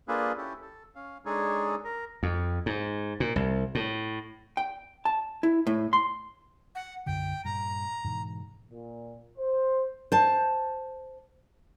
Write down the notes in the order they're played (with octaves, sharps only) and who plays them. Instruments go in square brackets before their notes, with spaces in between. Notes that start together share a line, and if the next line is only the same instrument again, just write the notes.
[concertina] A#3 D4 F4 G#4 A4 B4
C#4 E4 G4 A4
A4
C#4 F5
G#3 D4 D#4 G#4 A4 C#5
A#4
[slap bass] F2
G#2
A#2
C2
A2
[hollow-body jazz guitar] G5
A5
E4
A2
C6
[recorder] F#5
[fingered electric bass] B1 F#2 D3 [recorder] G5
[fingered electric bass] G2 A#2 [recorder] A#5
[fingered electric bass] G#2 B2 E3
[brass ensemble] A#2
C5
[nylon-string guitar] C5 A5